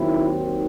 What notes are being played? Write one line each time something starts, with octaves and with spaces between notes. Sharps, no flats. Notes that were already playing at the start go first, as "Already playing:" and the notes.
Already playing: D#2 D#3 F#3 C4 E4